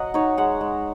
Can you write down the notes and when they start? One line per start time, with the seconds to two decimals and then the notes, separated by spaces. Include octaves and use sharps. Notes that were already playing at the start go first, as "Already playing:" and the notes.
Already playing: F#3 D#5 F#5
0.14 D#4 C#5
0.37 G#3 F#5
0.61 G#3